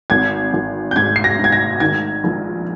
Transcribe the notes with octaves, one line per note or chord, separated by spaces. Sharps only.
G#1 G#6
G#1
G6
G#2 G#6
C7
A#6
G#2
G#6
A#6
D#3 G#6
A#1